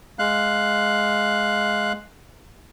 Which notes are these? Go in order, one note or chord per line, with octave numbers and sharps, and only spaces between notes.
G#3 F5 F#6